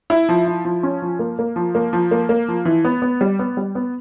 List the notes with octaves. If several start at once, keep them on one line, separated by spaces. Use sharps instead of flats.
E4
F3
E4
F3
C#4
F3
A#3
A#3
F3
A#3
F3
A#3
A#3
F3
E3
B3
B3
G3
B3
G3
B3